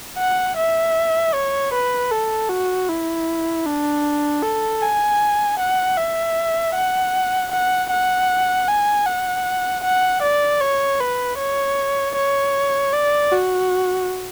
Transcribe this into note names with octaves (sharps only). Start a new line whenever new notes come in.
F#5
E5
C#5
B4
A4
F#4
E4
D4
A4
G#5
F#5
E5
F#5
F#5
F#5
G#5
F#5
F#5
D5
C#5
B4
C#5
C#5
D5
F#4